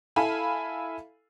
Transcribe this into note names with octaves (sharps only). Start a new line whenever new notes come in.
E4 A4 F5 G#5 B5